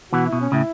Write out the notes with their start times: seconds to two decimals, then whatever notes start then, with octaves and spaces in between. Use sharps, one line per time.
0.13 B2 E3 F#4
0.27 E4
0.33 B2
0.41 C#4
0.52 A2 C#3 E4